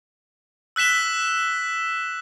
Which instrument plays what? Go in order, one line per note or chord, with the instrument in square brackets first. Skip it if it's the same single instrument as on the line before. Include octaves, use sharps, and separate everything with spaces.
[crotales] E6 F#6 B6 E7 G7